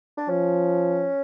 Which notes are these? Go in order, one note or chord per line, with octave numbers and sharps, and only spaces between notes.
D4
F3 C#4